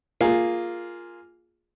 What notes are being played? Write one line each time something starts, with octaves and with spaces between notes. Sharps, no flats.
A#3 F4 G#4